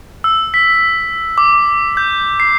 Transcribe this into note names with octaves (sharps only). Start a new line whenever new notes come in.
E6
B6
D6
G6
C7